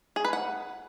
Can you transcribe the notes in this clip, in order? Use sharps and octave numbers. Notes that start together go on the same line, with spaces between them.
G#4
B4
F#5